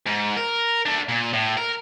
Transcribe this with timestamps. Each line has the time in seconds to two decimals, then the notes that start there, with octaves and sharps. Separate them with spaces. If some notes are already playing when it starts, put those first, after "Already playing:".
0.06 G#2
0.36 A#4
0.86 A3 D4
1.09 A#2
1.33 A2
1.57 A#4